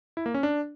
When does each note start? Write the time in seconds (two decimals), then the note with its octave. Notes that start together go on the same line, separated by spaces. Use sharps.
0.17 E4
0.26 A#3
0.34 C#4
0.43 D4